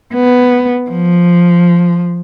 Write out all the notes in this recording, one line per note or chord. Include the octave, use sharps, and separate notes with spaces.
B3
F3